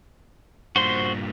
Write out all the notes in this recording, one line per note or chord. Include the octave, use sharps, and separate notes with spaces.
G2 A#2 F#4 C5 C6